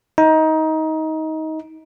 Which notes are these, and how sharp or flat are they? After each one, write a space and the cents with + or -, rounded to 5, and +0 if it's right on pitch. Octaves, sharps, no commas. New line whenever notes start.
D#4 +20